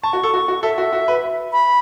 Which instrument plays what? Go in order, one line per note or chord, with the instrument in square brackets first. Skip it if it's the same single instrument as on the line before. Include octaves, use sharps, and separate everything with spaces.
[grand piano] A5 [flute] C#6
[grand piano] F#4
A4
F#4
F#4
[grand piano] A4 [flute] E5
[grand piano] F#4
F#4
B4
[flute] B5